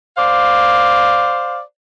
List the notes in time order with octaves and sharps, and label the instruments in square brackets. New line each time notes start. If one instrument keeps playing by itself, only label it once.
[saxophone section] C5 D5 F5